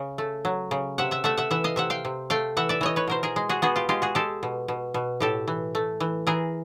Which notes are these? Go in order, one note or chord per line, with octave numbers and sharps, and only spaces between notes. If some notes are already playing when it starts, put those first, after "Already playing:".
Already playing: C#3
A3
F#3
C#3
C3 E5 F#5
E5 F#5
A3 E5 F#5
E5 F#5
E3 E5 F#5
D#5 F5
C3 E5 F#5
F5 G5
C3
A3 F5 G5
E3 E5 F#5
D5 E5
E3 C#5 D#5
B4 C#5
B2 A#4 C5
G#4 A#4
G#3
F#4 G#4
B3 F#4 G#4
F4 G4
G#3 F4 G4
F#4 G#4
G#3 G4 A4
B2
B2
B2
A2 G4 A4
E3
A3
E3
E3 G#4 A#4